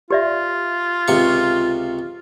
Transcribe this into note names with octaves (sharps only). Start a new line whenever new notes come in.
F4 G4 D5 E5
C#2 C3 C#6